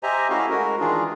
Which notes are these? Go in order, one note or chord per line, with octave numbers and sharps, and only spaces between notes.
G4 C5 D#5 E5 G#5 A#5
A3 C#4 E4 F#4 D#5 F5
G#3 F#4 A#4
D#3 E3 D4 F4 G#4